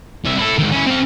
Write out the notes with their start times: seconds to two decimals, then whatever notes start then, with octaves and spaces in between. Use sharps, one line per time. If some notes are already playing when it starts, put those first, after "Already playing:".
0.25 C2 E5
0.38 E4 A4
0.58 G#2 D#3
0.72 C#4 E4
0.87 C4 F5